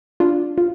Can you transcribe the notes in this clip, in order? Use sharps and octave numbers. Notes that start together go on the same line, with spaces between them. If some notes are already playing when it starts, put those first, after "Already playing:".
D4 F4
F4